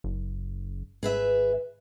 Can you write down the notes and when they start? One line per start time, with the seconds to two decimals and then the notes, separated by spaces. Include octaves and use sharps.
0.04 F#1
1.03 G#1 G#4 B4 E5